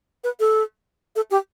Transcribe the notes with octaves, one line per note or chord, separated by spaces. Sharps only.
B4
A4
A4
G4